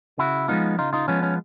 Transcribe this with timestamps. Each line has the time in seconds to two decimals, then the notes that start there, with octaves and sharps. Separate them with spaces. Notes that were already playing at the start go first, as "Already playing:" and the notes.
0.18 C#3 E4 F#4
0.48 F3 G#3 B3 D#4 F4
0.78 C#3 D#4 F4
0.93 D#4 F4
1.08 F3 G#3 B3 C#4
1.23 C#4